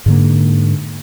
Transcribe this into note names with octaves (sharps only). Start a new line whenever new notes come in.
G#2 D3 A#3